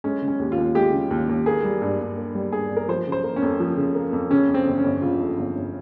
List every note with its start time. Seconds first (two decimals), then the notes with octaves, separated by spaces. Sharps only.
0.04 G#3 C#4
0.22 C#3
0.28 C#4
0.39 D#2
0.52 F4
0.58 D#2
0.75 G#3 G4
0.92 C#3
1.11 D#2
1.29 D#2
1.46 A#3 G#4
1.64 G3
1.82 G2
2.00 G2
2.17 A#3
2.35 G3
2.52 G2 G#4
2.71 G2
2.76 A#4
2.89 F3 C5
3.07 C#3
3.12 C5
3.24 A#3
3.36 C#4
3.42 F2
3.60 F3
3.77 C#3
3.95 A#3
4.13 F2
4.31 C#3 C#4
4.48 F2
4.54 C4
4.67 G1
4.78 C#4
4.84 G1
5.02 C#3 F4
5.20 F2
5.37 G1
5.55 G1